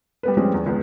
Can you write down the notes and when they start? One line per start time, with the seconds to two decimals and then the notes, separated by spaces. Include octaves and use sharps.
0.23 G3 B3 B4
0.37 F3 G3 G#3 C4 C#4 F4
0.54 E2
0.66 C#2 B3